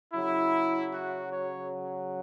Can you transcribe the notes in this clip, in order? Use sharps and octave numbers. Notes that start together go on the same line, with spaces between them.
C#3 F#3 E4
F#4
C#5